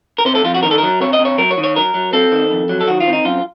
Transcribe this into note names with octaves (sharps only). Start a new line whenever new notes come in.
A#4
C3 C5
A4
F2 F4
F#4
D#3 A#4
A4
F#3 A#4
C3 C#5
D#5
C3
C#5
F#3 A#4
C#5
D#3
C#5
F#3 A#4
F#3
C4 A4
D#3
F2
F#3
A4
D#3 F#4
F4
C4
D#4
F#2 F4